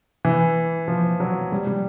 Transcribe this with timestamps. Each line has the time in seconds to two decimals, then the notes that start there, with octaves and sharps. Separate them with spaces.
0.25 E3
0.88 F3
1.20 F#3
1.52 G3
1.67 G3